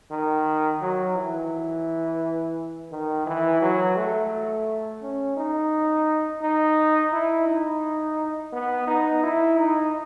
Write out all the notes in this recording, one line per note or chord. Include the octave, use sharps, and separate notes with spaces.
D#3
F#3
E3
D#3
E3
F#3
A3
C#4
D#4
D#4
E4
D#4
B3
D#4
E4
D#4